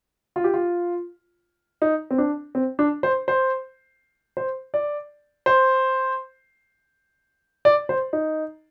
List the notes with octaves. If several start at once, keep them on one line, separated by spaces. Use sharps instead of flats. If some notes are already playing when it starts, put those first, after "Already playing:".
F4
G4
F4
D#4
C4
D4
C4
D4
C5
C5
C5
D5
C5
D5
C5
D#4